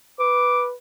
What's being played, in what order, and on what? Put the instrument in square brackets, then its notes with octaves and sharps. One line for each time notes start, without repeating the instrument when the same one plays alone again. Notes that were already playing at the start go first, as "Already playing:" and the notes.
[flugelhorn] B4 [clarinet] D6